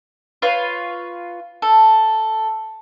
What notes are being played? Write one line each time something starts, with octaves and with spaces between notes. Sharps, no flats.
F4 B4 C#5 F5
A4